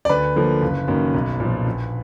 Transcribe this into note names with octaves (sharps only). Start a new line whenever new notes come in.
D5
D2 B4
D3 F3 A#3
F#1
F#2 D#3 A#3
B1
A#2
F3
A#1